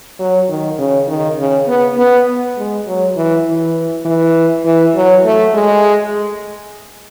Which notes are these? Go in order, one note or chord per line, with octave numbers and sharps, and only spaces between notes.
F#3
D#3
C#3
D#3
C#3
B3
B3
G#3
F#3
E3
E3
E3
E3
F#3
A3
G#3